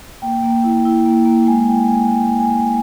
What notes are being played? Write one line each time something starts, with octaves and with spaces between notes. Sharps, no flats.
A#3 G5
A#3
E4
E4
A#3
A#3
G#3 G#5
E4 G5
G#3 G#5
G#3 G5
G#3
G#5
G#3